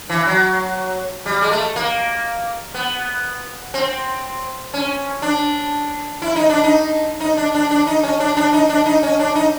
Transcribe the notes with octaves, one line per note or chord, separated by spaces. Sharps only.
E3
F#3
G3
G#3
A3
A#3
B3
C4
C#4
D4
E4
D#4
D4
D#4
D#4
D4
D4
D4
D#4
C#4
D4
D4
D#4
D4
D#4
C#4
D4
D#4